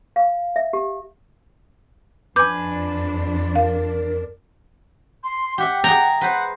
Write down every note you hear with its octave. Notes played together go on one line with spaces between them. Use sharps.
F5
E5
G4
F2 D4 B4 G#5 D6 G6
A#4 F5
C6
G4 E5 F#5
G#4 F#5 G5 A#5
B4 C5 F#5